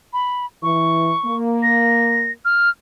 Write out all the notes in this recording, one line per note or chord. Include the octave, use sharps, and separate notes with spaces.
B5
E3 C#6
A#3
A#6
F6